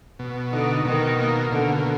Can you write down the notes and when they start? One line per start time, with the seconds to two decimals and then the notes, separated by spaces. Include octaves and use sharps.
0.19 B2
0.52 D3 D#4
0.85 B2 D#3
1.19 A#3
1.52 B2 D3